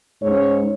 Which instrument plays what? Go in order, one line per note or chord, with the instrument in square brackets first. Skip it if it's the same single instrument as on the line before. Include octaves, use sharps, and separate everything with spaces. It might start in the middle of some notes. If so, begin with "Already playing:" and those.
[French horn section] G#2 G#3 C#4 C#5